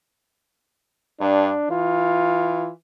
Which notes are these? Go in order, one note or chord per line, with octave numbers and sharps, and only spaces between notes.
G2 D4
E3 F4